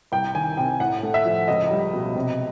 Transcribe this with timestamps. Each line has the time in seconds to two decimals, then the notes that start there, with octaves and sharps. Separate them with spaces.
0.12 C2 G5
0.35 D#3 G#5
0.57 C3 G5
0.80 A2 F#5
1.03 A3
1.14 E5
1.25 F3
1.48 C#2 D#5
1.71 G3
1.93 B2
2.16 C3